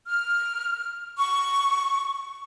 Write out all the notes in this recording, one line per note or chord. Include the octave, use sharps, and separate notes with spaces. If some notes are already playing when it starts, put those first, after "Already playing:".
F6
C#6